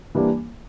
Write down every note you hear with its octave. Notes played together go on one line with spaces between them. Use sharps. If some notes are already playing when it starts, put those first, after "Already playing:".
E3 G3 A#3 D4